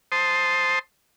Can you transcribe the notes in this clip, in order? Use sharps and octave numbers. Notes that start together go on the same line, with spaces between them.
C5 A5 C6 D#6